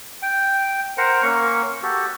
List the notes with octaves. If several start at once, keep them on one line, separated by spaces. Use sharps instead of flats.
G5
A#4 C5 F#5 A#5
A#3 C#4 C#6
F#4 G4 A4